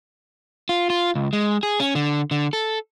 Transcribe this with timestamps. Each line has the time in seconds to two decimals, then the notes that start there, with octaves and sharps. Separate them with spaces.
0.69 F4
0.90 F4
1.15 C#2
1.33 G#3
1.63 G#4
1.80 C#4
1.95 D3
2.31 D3
2.53 A4